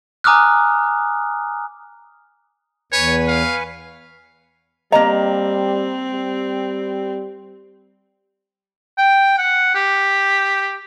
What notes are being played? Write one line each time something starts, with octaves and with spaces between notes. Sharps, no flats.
G#5 A#5 D6 D#6 F6 F#6
E2 B4 C#5 G#5 C#6
F5
G3 A#3 C4 D#5 A5 A#5
G3
G5
F#5
G4